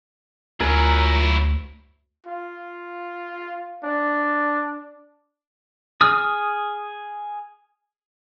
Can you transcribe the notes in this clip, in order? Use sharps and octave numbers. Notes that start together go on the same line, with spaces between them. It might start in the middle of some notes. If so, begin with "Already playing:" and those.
D2 F#3 E4 F4 A#4 G#5
F4
D4
G#4 D#6 F6